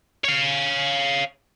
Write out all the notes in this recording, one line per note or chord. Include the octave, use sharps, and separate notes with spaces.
C#5 F5